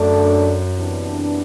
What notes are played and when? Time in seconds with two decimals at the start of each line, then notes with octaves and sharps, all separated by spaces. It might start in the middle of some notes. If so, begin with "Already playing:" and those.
Already playing: F#2 D3 A3 D4 A4 D5
0.76 C3 E3 B3 D4